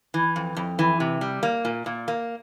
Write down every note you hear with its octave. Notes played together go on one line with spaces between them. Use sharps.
E3
F2
F2
E3
C3
G3
A#3
A#2
A#2
A#3